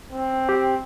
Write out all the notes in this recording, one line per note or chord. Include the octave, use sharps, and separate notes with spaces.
C4
G4